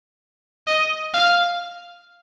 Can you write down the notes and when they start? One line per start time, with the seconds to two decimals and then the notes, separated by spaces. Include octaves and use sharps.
0.67 D#5
1.14 F5